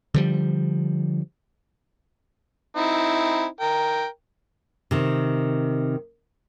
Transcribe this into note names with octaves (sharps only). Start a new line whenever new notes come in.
D3 F3 G3
C4 D#4 E4
A#4 G5
C3 D#3